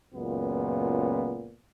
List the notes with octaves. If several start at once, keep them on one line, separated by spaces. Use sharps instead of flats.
C#2 F#2 A#2 B3